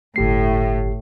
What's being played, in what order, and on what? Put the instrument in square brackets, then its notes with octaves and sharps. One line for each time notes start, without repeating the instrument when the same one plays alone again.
[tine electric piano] G1 G4 C7 [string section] A2